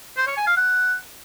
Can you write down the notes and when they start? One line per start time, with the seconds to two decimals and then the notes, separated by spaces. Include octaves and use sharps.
0.17 C5
0.27 C#5
0.37 G#5
0.47 F5
0.57 F#5